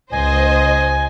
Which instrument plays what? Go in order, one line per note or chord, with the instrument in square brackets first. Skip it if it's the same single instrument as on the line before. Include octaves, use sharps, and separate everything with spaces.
[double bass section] C#2 [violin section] C5 D#5 [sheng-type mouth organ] G#5